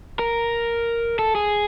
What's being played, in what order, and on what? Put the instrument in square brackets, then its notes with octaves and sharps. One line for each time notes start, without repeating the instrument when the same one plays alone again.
[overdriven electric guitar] A#4
A4
G#4